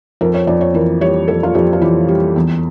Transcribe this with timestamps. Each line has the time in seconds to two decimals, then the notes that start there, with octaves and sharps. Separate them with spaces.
0.21 F2 A#4
0.34 C#5
0.47 F2 D5
0.61 C#5
0.74 E3 A#4
1.01 G3 C#5
1.28 F2 A4
1.43 F4
1.55 F2 G4
1.73 F4
1.82 E3 G4
2.08 G3
2.36 E2